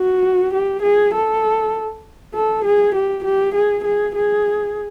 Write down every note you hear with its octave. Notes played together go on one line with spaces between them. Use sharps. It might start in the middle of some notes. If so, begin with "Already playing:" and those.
Already playing: F#4
G4
G#4
A4
A4
G#4
G4
G4
G#4
G#4
G#4